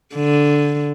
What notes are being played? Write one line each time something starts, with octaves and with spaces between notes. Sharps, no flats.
D3